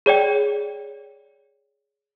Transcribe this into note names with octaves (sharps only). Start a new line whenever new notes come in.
G#4 C#5 D5 G5